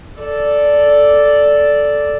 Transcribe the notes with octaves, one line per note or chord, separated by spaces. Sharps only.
A4 D5